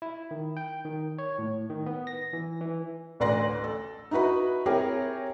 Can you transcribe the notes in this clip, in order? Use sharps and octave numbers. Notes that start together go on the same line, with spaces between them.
E4
D#3
G5
D#3
C#5
A2
D#3
B3
A#6
E3
E3
A1 D2 B4 D5 C6 A#6
A4
D#4 E4 F#4 B4 B5
C4 E4 G4 G#4 A#4 C#5